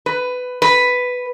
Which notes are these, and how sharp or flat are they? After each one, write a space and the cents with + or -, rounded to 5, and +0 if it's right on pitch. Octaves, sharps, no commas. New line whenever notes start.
B4 +15
B4 +5